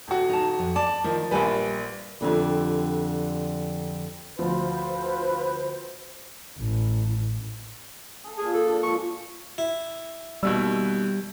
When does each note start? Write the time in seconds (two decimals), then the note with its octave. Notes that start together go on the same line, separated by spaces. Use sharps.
0.08 D#1 F#4
0.30 D#4 A5
0.59 F2
0.76 D5 A5
1.04 D#3 F3
1.31 A#1 G3 A#3 B4 C5 G#5
2.21 F2 G#2 D3 G3
4.39 D2 F3 F4 B4 C5
6.59 A1
8.24 G#4 A4
8.38 A#2 G#4 A5
8.54 A4
8.66 D4
8.83 A#2 F3 G#3 C#6
9.58 E4
10.43 D#2 B2 G3 E6